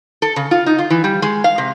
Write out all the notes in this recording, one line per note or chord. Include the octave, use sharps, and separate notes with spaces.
A4
C#3
F4
D#4
F4
E3
G3
G#3
F5
C3